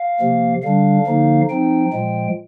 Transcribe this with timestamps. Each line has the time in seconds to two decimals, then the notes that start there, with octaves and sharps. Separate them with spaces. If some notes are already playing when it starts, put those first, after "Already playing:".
Already playing: F5
0.19 C3 F3 A#3
0.63 D3 G3 D4 F5
1.07 D3 F3 A#3 D#4
1.50 F3 C4 D#4 G5
1.93 A#2 F3 G#3